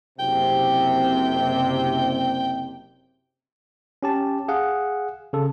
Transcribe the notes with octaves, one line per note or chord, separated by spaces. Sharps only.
F#1 C3 G5
C#4 G4 A5
G#4 F5 F#5
C#3 A4